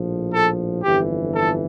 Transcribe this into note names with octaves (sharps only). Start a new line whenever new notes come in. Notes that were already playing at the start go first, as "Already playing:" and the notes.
Already playing: A#1 A2 F3
A4
G1 F2 E3 G4
A4